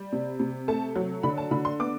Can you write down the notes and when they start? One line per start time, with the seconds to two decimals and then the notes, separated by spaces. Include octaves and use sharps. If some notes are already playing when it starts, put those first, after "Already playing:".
Already playing: G3
0.12 C3
0.40 C3
0.68 A3 A5
0.96 F#3
1.23 D3 B5
1.38 A5
1.51 D3 B5
1.65 C6
1.79 B3 D6